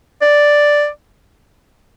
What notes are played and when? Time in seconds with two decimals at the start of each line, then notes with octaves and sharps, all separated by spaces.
0.22 D5